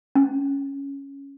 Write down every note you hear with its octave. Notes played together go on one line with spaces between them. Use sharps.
C#4